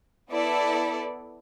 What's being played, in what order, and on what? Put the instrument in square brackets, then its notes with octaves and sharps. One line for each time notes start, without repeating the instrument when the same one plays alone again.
[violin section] B3 E4 A4 D5